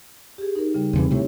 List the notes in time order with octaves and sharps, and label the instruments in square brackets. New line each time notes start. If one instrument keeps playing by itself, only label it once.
[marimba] G4 G#4
D#4 A#4
C#3 G3
[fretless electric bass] E2 C#3 E3 [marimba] C4
[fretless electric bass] D2 C3 A3 [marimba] E4 G4 C#5